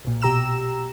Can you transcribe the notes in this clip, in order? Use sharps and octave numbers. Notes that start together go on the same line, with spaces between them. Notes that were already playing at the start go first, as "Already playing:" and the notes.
B1 A#2
B2 G4 A#5 E6 E7